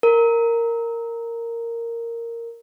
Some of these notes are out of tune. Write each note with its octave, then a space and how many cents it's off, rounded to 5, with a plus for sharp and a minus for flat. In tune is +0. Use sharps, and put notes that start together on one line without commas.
A#4 -10